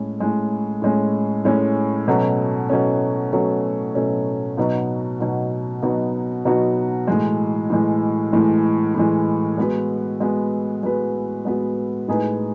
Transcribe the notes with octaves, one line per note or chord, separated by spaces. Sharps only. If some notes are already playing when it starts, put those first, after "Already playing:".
Already playing: A2 G#3 C#4
A2 G#3 C#4
A2 G#3 C#4
A2 G#3 C#4
B2 F#3 A3 C#4
B2 F#3 A3 C#4
B2 F#3 A3 C#4
B2 F#3 A3 C#4
B2 F#3 B3 D#4 F#4
B2 F#3 B3 D#4 F#4
B2 F#3 B3 D#4 F#4
B2 F#3 B3 D#4 F#4
A2 E3 G#3
A2 E3 G#3
A2 E3 G#3
A2 E3 G#3
G#3 B3 F#4 B4
G#3 B3 F#4 B4
G#3 B3 F#4 B4
G#3 B3 F#4 B4
A2 G#3 D#4 G#4 B4